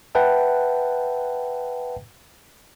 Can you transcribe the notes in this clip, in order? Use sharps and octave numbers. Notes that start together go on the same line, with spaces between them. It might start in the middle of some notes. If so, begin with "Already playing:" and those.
B4 E5 F#5 G5 A5